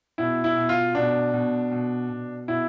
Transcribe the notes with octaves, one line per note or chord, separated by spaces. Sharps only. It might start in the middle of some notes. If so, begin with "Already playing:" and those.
B2 E4
E4
B2
F4
B2 D4
B2
B2
B2
B2 E4